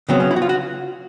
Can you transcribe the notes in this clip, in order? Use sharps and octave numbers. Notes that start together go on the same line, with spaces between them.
C#3 F#3 B3 C4
C#4
E4
F#4
F4
F#4